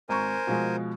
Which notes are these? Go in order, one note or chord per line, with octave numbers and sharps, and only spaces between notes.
G#1 A#4 C5 G#5 A#5 C#6
B2 F3 G#3